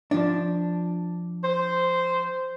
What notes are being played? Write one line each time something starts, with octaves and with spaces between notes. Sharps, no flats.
F3 D4
C5